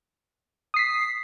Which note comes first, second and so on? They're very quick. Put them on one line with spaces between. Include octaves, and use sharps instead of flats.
D#6 C7 B6